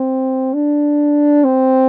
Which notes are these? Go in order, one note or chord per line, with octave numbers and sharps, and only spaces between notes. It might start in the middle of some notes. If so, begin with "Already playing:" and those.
Already playing: C4
D4
C4